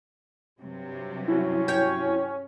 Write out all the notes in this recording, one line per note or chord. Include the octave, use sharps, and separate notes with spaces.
G2 C3 F#3
C#4 E4 F#4
C#5 G5